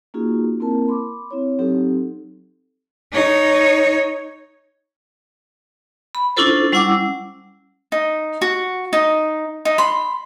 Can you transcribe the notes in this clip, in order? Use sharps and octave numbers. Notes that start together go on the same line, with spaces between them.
A#3 C#4 D#4 F4 F#4 G#4
A#3 C4 E4 A#4 A5
B5 C6 D6
C4 E4 C#5
F#3 C4 D#4 G4 A4
D#4 C#5
B5
C#4 D4 E4 F4 A4 C5
G3 C#4 E4 F#5 D6 E6
D#4
F#4
D#4
D#4
B5 C6